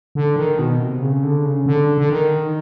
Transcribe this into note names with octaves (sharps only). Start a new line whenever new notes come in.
D3
D#3
B2
C3
C#3
D3
C#3
D3
D3
D#3